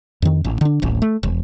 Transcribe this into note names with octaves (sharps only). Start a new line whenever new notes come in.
F2 D#3
A1
D3 D4
D1 A1
A3
E1